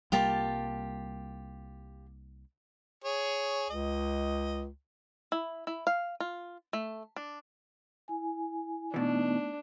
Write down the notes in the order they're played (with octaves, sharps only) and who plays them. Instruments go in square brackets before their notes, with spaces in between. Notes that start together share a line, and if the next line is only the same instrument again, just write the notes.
[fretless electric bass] C2 G3 A#3 [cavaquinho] F4 G4 A5
[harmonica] G#4 C#5
[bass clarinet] C#2 [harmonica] D#5
[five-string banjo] E4
E4
F5
F4
A3
D4
[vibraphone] E4 G#5
[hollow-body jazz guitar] B2 E3 [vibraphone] A3 B3 D#4 [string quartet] D4